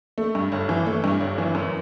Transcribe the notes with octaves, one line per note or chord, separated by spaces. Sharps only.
A3
G2
G1
E3
A3
G2
G1
E3
F#2